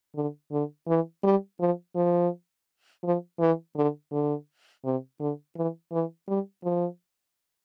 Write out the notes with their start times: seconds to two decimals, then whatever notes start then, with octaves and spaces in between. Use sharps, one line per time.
0.15 D3
0.52 D3
0.88 E3
1.24 G3
1.60 F3
1.96 F3
3.04 F3
3.40 E3
3.76 D3
4.12 D3
4.85 C3
5.20 D3
5.56 E3
5.92 E3
6.28 G3
6.64 F3